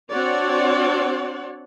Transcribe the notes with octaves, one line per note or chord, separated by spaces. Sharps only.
C4 D4 F#4 C#5 D5 F#5